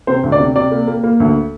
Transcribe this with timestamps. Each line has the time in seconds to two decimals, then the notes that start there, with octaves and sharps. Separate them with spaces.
0.07 C3 C5
0.23 D2
0.32 D5
0.39 C3
0.56 C3 D5
0.71 A#3
0.88 A#3
1.04 A#3
1.20 D2